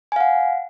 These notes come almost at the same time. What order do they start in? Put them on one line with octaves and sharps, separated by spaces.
G#5 F5 F#5